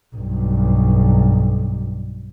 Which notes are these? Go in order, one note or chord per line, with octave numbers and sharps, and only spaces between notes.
B1 G2